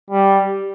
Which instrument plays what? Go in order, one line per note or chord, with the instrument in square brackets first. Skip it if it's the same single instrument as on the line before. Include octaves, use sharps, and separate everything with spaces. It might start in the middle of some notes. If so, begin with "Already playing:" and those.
[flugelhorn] G3